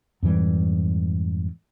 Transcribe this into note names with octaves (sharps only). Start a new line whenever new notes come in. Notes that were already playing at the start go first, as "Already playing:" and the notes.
F2 G#2 E3 G3